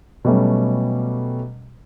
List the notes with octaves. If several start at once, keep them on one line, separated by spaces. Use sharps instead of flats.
B2 F#3 G3 A3 C#4